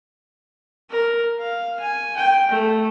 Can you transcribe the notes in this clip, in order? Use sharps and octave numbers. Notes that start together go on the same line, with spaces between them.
A#4
F5
G#5
G5
A3